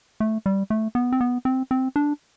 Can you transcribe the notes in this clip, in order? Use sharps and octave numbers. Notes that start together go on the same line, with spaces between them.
A3
G3
A3
B3
C4
B3
C4
C4
D4